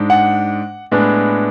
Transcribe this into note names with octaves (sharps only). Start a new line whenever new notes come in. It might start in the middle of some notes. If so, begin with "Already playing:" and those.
Already playing: G#2 G#3 D4
F#5
A2 G#3 B3 D4